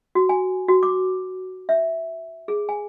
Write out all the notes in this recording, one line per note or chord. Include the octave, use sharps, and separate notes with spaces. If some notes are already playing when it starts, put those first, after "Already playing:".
F#4
G#5
F#4
D6
E5
G#4
G#5